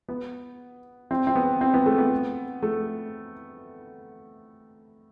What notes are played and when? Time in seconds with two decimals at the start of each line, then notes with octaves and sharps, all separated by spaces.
0.09 B3
1.11 C4
1.27 C4
1.35 B3
1.61 C4
1.74 B3
1.86 A3
1.98 B3
2.63 A3